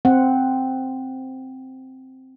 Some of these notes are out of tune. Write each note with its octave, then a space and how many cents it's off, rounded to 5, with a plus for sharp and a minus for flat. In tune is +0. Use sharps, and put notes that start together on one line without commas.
C4 +0 F#5 +0